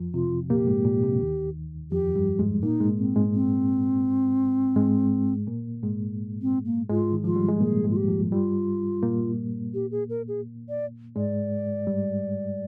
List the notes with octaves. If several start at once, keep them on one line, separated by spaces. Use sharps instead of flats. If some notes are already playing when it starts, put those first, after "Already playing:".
Already playing: F2 F3
C3 F4
A#2 A#3 G4
G#2 G#3
A#2
C3
D#2 D#3
F2 F3 G4
G2 G3
G#2 G#3
A#2 A#3 D#4
G#2 G#3
C4
G#2 G#3
C4
G#2 G#3
A#2 A#3
G#2 G#3
C4
A#3
G#2 G#3 F4
D#3
F3 F4
G3
G#3
A#2 A#3 G#4
G#2 G#3
F4
G4
F2 F3
G2 G3 F4
A#2 A#3
G4
G#4
A#4
G#4
D5
G#2 G#3 D5
G2 G3